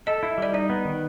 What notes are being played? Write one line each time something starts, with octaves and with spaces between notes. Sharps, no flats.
A4 D#5
E4
G3 D5
D#4 D5
B3
D#3